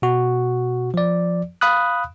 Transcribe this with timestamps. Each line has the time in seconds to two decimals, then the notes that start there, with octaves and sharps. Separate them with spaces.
0.02 B2 F#4
0.94 F3 D5
1.61 F5 B5 D#6 F#6